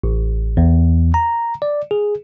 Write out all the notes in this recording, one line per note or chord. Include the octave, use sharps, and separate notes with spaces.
A1
E2
A#5
D5
G#4